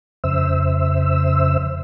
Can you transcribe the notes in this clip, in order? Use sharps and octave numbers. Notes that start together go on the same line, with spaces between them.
F2 C#3 C5 E5 E6